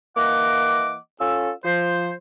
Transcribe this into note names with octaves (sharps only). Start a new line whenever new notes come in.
E3 A#3 D#5 F#5 D6
C#4 F4 A4 E6
F3 C5